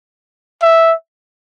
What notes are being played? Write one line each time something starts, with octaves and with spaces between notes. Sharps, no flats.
E5